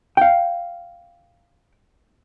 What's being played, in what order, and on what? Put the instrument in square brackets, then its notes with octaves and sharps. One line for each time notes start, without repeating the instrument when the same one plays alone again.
[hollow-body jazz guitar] F5 G5